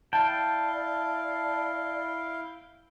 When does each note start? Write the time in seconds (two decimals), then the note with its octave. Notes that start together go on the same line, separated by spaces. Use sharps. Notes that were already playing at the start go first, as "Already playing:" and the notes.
0.13 E4 D5 F5 G5 A5